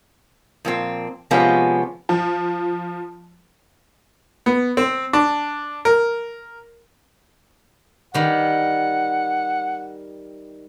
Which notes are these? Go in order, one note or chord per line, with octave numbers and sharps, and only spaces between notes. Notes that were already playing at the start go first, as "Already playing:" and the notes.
F2 A#2 C4
C3 F3 G#3 B3 C#4 F4
F3
B3
C4
D4
A#4
D#3 G3 F#5